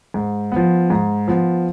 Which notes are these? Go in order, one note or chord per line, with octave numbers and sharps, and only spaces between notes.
G#2
F3 B3
G#2
F3 B3